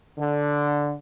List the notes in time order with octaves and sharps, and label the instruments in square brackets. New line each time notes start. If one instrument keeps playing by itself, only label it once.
[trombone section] D3